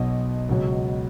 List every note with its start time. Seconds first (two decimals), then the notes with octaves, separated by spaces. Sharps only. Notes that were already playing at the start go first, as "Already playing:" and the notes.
Already playing: B1 B2 F#3 D#5
0.49 C#2 B2 F#3